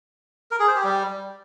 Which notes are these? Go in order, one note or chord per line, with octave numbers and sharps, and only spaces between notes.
A#4
G#4
C5
G4
G3